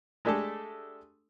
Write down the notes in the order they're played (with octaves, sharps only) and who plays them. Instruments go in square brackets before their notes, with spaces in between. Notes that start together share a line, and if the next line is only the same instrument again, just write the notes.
[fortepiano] G#3 A3 D4 G4 A4